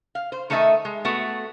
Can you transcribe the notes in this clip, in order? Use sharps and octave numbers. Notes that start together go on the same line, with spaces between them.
F5
C5
D#3 A3 A4 D#5 E5 G#5
G#3
A3 B3 F#4